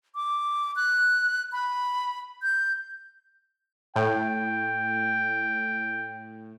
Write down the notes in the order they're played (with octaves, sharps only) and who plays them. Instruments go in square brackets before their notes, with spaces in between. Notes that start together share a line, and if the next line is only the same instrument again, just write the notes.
[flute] D6
F#6
B5
G6
[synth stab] A2 [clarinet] G5